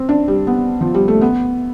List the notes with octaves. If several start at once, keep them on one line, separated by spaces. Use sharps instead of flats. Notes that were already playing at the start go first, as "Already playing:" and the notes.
Already playing: C4
D4
G3
B3
F3
G3
A3
B3